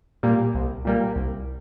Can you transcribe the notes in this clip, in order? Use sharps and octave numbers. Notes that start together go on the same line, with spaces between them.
A#2 G3 A#3
C2
A#2 G3 A#3
C2